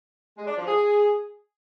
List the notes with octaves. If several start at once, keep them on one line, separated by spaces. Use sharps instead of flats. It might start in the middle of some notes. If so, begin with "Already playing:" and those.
G#3
D4
F3
G#4